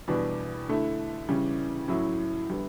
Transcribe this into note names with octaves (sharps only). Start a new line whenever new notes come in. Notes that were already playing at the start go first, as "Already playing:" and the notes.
E2 B2 G3 B3 D4
D3 A3 E4
C#3 E3 G3 C#4
A2 F#3 C#4 E4
D3 G3 B3 E4